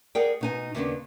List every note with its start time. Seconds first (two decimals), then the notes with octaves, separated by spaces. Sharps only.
0.15 G#4 A#4 D5 F#5 G5
0.41 B2 D#4 G#5
0.75 D#2 C#3 B3 D4